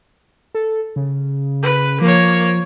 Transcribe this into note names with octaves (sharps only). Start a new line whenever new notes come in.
A4
C#3
B4
F3 A#3 C#5